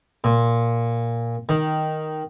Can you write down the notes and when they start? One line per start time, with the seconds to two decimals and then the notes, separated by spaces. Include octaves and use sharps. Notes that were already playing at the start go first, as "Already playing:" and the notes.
0.24 A#2
1.49 D#3